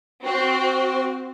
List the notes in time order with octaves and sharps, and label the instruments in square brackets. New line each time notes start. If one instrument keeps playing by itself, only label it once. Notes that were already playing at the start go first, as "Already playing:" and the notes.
[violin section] C4 [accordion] F#4